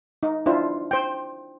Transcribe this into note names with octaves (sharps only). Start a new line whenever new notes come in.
D#4
D4 E4 F4 C5
C5 G5